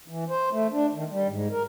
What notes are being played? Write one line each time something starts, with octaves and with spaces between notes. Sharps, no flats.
E3
C5
A3
D4
D#3
G3
G#2
A#4